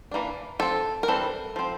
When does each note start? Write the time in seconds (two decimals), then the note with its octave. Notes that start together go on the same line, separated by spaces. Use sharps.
0.11 E3 A#3 D4
0.59 F3 C4 A4
1.03 A#4
1.08 E3 G3 C4 A4
1.56 F3 C4